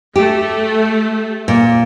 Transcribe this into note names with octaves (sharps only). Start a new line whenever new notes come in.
A3 G4
A#2